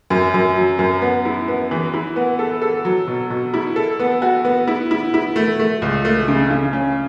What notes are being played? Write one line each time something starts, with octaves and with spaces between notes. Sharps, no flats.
F#2
F#2
F#3
F#2
B3
E4
B3
E3
E4
B3
A4
A4
F#3
B2
B2
E4
A4
B3
F#4
B3
E4
E4
E4
A3
A3
C#2
A3
C#3
C#3
C#4